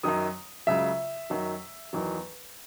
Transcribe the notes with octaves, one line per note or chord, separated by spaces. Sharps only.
F#2 D#3 F#3 D#6
C#2 C#3 F#3 E5
F#2 D#3 F#3
E2 D#3 F#3